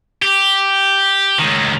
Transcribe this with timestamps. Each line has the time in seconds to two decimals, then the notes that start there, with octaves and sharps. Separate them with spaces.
0.22 G4
1.39 C#2 D#3